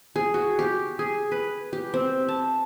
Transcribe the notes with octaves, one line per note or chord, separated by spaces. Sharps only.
G#4
F#4
G4
G#4
B4
G4
C4
A5